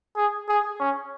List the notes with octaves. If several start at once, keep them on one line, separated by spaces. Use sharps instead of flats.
G#4
G#4
C#4